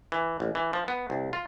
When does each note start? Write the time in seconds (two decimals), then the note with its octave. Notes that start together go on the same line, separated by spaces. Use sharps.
0.12 E3
0.40 A1
0.55 E3
0.73 F3
0.88 B3
1.10 C2
1.33 F4